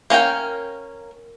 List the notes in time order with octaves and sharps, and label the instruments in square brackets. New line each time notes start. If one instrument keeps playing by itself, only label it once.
[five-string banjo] A#3 C#4 A#4 G5